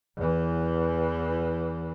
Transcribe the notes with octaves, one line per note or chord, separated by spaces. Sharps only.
E2 E3